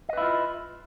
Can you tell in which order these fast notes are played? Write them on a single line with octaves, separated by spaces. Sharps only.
D#5 B4 E4 F4